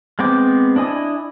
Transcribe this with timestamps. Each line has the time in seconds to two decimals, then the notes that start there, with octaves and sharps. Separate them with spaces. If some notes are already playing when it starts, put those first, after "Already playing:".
0.19 G#3 B3 C4 G5 D6
0.76 D4 E4 D#5 G#5